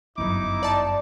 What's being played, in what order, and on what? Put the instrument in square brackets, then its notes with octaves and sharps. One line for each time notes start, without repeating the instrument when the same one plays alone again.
[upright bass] G1 F#2 [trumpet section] D#4 E4 D6
[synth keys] D5 A5